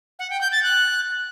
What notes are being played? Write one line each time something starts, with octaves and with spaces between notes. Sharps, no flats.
F#5
G5
G6
A6
F#6